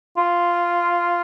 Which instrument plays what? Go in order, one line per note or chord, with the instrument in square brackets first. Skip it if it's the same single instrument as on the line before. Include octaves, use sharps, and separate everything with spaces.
[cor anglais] F4